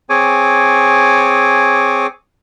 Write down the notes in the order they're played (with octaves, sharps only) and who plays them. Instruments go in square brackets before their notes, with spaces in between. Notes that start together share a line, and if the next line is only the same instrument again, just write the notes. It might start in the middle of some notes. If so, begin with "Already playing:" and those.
[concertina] C4 G#4 C#5 G#5 D6